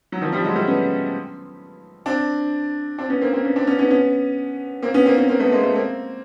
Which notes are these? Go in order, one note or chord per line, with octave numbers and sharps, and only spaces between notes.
F#3
D#3 F3
F3 G3
F#3 G#3
G3 A3
B3 C#4
C4 D4
C4 D4
B3 C#4
A#3 C4
A#3 C4
B3 C#4
C4 D4
B3 C#4
B3 C#4
B3 C#4
A#3 C4
B3 C#4
A#3 C4
B3 C#4
A#3 C4
A3 B3
G#3 A#3
A3 B3
A#3 C4